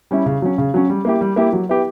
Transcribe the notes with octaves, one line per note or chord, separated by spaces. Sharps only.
G3 C#4 E4
C#3
F#3 C#4
C#3
F#3 C#4
G3
A#3 E4 G4
G3
A#3 E4 G4
F#3
B3 E4 G4